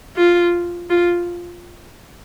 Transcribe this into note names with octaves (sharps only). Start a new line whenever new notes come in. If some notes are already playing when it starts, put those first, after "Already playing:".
F4
F4